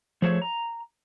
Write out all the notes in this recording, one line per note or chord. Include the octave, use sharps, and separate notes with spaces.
F3 A3 G#4 C5 C#5
A#5